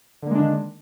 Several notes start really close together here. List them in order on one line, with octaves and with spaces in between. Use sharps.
D3 A#3 G#3 D4 D#3